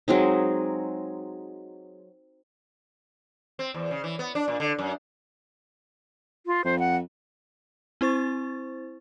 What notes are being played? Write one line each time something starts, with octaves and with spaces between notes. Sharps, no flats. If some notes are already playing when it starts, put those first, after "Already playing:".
F#3 G#3 C4 D#4
C4
E2
C#3
E3
B3
D4
A#2
D3
F#2
F4
F2 C5
F#5
C4 E4 C5 C#6 A6